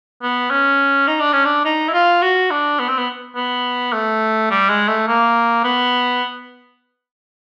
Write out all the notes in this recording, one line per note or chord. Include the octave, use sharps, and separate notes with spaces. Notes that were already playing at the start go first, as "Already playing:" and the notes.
B3
C#4
D#4
D4
C#4
D4
D#4
E4
F4
F#4
D4
B3
C4
B3
B3
A3
G3
G#3
A3
A#3
B3